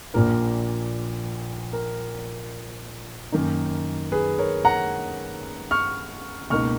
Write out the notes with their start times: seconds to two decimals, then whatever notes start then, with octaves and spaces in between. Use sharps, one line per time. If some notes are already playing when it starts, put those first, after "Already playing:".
0.14 A#1 A#2 F3 A#3 A#4
1.73 A#4
3.32 F#2 D#3 A#3 D#4
4.12 G#4 B4
4.38 A#4 C#5
4.65 F#5 A#5
5.71 C#6 F6
6.50 C#2 B2 A#3 D#4 C#6 F6